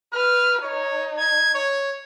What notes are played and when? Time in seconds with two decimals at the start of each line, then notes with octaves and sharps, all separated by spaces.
0.13 B4 F6
0.63 D#4 C#5
1.18 G#6
1.55 C#5